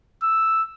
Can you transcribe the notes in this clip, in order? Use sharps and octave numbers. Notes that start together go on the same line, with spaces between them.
E6